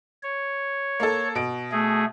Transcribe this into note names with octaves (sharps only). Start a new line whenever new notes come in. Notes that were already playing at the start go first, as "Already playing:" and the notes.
C#5
A#3 A4
B2 D7
A3 G#4